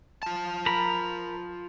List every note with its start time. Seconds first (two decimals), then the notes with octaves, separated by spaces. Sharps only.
0.23 F4 A5
0.66 A#4 B5